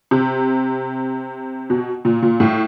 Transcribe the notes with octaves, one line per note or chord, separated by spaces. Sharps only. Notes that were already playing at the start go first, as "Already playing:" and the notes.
C3
B2
A#2
A#2
A2